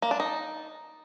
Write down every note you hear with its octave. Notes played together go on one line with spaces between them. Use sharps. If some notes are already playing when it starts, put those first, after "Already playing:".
A#3
D4
D#4